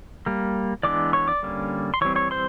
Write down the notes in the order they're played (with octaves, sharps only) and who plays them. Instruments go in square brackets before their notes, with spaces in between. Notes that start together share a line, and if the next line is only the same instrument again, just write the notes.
[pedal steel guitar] G3 A#3
E3 G#3 B3 D4 D5 D6
C#5 C#6
D5 D6
D3 G3 A#3 C#4
C6
E3 G3 C4 C#5 C#6
C#5 C#6
C5 C6